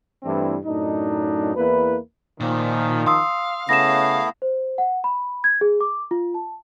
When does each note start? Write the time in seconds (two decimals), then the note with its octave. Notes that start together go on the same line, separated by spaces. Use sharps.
0.23 G2 E3 A3 C4 D4 E4
0.65 F#2 A2 D4 D#4
1.56 E2 A#3 E4 B4
2.40 A#2 D#3 F3
3.07 F5 C6 D#6 E6
3.69 C#3 A3 B3 E4 A#6 E7
4.42 C5
4.78 F#5
5.04 B5
5.44 G#6
5.61 G#4
5.81 D6
6.11 F4
6.34 A5